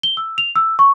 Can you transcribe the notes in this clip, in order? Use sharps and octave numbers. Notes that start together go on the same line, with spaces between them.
G7
E6
F7
E6
C#6